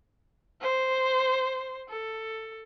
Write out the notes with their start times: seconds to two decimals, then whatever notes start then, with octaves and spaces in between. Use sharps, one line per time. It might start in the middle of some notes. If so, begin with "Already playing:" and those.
0.61 C5
1.89 A4